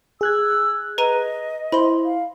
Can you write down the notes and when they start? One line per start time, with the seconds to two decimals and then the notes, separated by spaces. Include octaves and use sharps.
0.21 G#4 E6 F#6 G#6
0.98 B4 D#5 A#5 D#7
1.72 E4 C5 B5 C6
2.05 F5